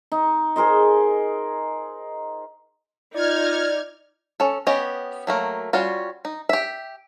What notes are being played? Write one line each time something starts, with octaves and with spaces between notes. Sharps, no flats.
D#4
G#4 A#4 C5 D#5
D#4 F4 D5 F6 G#6
C#4 A4
B3 C#4 G4 D#5
F#3 A3 A#3
G3 C#4 F4 F#4
D#4
G4 E5